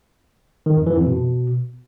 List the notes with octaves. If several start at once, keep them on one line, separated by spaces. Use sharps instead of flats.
D#3
F2
E3
F2
B2